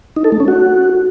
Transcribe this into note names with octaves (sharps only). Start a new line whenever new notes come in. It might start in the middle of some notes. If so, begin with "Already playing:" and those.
D#4
A4
A3
C#4
F#4